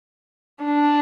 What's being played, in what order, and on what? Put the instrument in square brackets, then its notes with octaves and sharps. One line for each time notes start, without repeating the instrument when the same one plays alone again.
[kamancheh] D4